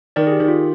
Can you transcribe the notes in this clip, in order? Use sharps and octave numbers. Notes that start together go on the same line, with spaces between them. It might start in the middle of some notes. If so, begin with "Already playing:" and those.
D#3 A#4 D5
G#4
G4
D#3
F4